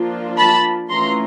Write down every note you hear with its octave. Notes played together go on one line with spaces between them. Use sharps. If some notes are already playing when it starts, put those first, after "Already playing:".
Already playing: F3 A#3 D4 F4
A5 B5
E3 A3 C#4 F4 A#5 C6